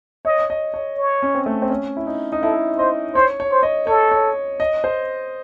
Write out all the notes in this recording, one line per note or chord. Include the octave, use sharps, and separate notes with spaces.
C#5 D#5
D#5
C#5
C#5
C#4
C4
A3
C4
C#4
E4
D#4
D#4
E4 A4
C5 D#5
C5 C#5
C#5
C5
D#5
A4 C#5
C#5
D#5
C5